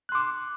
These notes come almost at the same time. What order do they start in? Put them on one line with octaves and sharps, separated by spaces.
F#6 C6 D6